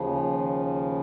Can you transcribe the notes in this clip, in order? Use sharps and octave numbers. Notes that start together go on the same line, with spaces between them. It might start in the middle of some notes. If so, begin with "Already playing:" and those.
Already playing: D#2 C#3 F3